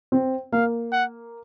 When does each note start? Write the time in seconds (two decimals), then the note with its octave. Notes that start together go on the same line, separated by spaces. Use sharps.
0.12 C4
0.52 A#3 F5
0.92 F#5